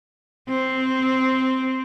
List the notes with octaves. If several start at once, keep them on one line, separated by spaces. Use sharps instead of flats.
C4